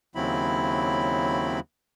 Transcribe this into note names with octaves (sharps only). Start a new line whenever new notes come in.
D#2 C#3 F#3 C4 E4 B5